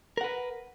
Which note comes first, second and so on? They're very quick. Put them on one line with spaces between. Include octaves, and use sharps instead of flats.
A#4 F#5 B4